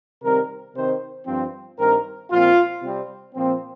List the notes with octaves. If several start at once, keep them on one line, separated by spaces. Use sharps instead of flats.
C3 D#3 G3 C4 A#4
C3 D#3 C4 C5
G2 F3 C4
G2 D#3 C4 A#4
A#2 F3 C4 F4
C3 G3 C4
A#2 F3 C4